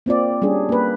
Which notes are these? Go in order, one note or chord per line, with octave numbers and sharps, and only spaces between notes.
A#3 C4 F4 D5
G3 C#4 D4 G#4
A#3 B4